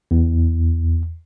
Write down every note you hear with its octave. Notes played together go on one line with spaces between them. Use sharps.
E2